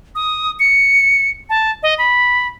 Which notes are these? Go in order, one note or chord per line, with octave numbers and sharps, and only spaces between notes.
D#6
C#7
A5
D#5
B5